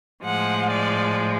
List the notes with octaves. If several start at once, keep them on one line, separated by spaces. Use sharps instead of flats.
A2 F3 G#3 F#5
D5